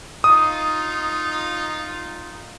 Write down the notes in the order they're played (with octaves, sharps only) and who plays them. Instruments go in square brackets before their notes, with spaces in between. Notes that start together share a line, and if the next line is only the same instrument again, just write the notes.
[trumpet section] D#4 F4 [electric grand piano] D#6